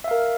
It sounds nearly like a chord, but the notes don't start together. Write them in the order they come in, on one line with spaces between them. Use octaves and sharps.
E5 F5 A#4